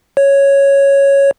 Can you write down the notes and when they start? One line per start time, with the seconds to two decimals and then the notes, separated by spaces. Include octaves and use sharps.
0.17 C#5